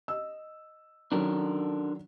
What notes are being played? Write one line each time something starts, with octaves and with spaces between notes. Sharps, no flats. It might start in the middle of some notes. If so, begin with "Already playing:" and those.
D#5 E6
D#3 F#3 C#4 D4 A4 A#4